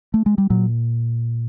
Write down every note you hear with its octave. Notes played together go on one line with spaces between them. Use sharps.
A3
G#3
G3
A#2 F#3